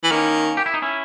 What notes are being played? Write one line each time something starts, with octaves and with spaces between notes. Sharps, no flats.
E3
D#3 A#3 C#4
G4
E4
D#4
C#4 E4